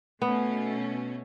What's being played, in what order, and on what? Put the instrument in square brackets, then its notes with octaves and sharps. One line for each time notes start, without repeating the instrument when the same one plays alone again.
[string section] B2 A3 C#4 [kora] B3